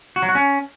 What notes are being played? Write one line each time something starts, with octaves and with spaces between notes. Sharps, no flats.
F#4
F#3
F#4
C#4